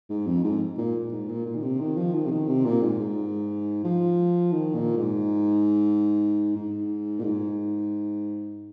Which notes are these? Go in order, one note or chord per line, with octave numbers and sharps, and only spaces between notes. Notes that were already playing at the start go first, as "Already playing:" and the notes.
G#2
F2
G#2
A#2
G#2
A#2
A#2
D#3
C3
D#3
F3
D#3
C3
D#3
C3
A#2
G#2
G#2
F3
D#3
A#2
G#2
G#2
A#2
G#2